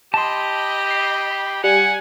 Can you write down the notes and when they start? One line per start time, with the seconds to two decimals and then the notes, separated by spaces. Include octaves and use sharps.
0.14 G4 D#5 A5 B5 C6
0.91 C7
1.64 G3 F#5 G#5